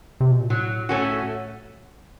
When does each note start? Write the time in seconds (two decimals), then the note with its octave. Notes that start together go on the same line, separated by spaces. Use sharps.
0.20 C3
0.31 B2
0.40 A#2
0.50 A2 F#3
0.89 A3 C#4 F#4